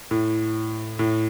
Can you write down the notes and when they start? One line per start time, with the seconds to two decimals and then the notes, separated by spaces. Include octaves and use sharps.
0.11 A2
0.99 A2